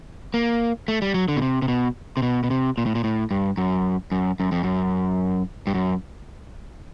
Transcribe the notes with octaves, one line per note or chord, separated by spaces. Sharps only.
A#3
A3
G3
F#3
D3
B2
C3
C3
B2
C3
B2
B2
C3
A#2
A2
A#2
A2
G2
F#2
F#2
F#2
F2
F#2
G2
F#2